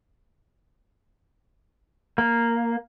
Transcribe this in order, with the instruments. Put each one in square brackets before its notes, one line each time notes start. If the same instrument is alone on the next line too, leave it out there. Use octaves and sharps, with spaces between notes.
[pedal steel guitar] A#3